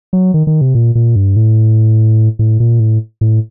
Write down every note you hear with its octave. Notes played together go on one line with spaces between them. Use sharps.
F#3
D#3
D#3
C3
A#2
A#2
G2
A2
A2
A#2
A2
A2